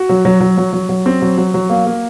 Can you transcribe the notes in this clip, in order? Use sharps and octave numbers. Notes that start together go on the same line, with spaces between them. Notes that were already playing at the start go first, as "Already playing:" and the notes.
Already playing: F#4
F#3
F#3
F#3
F#3
F#3
F#3
C4
F#3
F#3
F#3
A#3
A#3